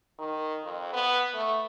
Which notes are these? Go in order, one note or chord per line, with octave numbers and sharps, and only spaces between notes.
D#3
F2
B3
A3